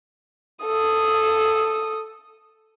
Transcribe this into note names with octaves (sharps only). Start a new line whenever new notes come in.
A4 D#6